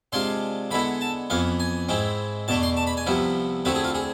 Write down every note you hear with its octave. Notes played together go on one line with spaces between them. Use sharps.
C3 G#3 D4 F4 C6
D3 G#3 B3 E4 B5
A5
F2 E3 B3 F5
G#5
G#2 G#3 C4 E4
E2 B2 A3 D4 A5
C6
A5
B5
G#5
C2 C3 F3 B3 E4
D2 D3 A3 C4 E4 B4
G#4
F4
G#4